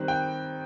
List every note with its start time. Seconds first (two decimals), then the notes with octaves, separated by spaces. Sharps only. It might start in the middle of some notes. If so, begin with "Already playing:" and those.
Already playing: D#3 G3 C4 F#6
0.08 G5